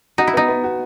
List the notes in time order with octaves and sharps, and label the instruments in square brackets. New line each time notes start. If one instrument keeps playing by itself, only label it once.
[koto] D#4 [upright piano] F#4
[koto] E4
[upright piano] B3 [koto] D#4
[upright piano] B3
F#4